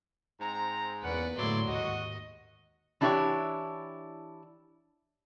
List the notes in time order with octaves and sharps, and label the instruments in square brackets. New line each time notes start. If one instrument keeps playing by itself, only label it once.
[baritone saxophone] G#2 [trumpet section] C4 A#5
[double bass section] E2 A#3 [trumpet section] C#4 F#5 [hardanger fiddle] B4 D5
[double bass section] A2 D3 A#3 [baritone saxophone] F#3 [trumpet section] E4 G#4 D5 [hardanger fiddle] C6
[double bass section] D#2 G#2 [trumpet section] F#4 [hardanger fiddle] D#5
[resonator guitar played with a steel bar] E3 D4 E4 G4 A4 C#5